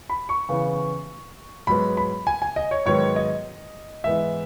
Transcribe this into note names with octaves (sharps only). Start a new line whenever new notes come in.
B5
C#6
C#3 E3 B3
G#2 F#3 B3 B5
B5
G#5
G#5
D#5
C#5
G#2 D#3 F#3 B3 C#5
D#5
G#2 E3 B3 E5